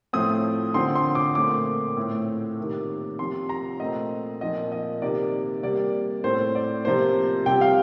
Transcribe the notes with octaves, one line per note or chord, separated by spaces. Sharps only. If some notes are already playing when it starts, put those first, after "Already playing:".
A2 F3 A3 C4 D#6
D3 F3 C4 C6
C6
D6
A#2 A3 C4 D6
A2 A3 C4
C3 D#3 A#3
C3 F3 C4 C6
A#5
A#2 A3 C4 D#5
A#2 F3 C4 D#5
D#5
C3 D#3 A#3 D5
C3 G3 A#3 D5
A2 A3 C4 C5
D5
C3 F3 A#3 C5
C3 G3 C4 G5
F5